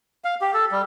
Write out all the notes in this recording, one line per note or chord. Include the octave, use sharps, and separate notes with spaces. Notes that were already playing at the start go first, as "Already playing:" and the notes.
F5
G4
A4
G3